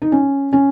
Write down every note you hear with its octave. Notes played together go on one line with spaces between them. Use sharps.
D#4
C#4
C#4